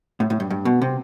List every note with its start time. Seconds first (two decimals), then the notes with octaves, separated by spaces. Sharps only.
0.20 A2
0.30 A2
0.40 G2
0.50 G2
0.65 B2
0.82 C3